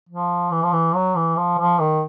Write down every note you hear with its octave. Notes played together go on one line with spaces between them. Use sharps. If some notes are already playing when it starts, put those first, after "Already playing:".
F3
E3
F3
E3
F#3
E3
F3
F3
D#3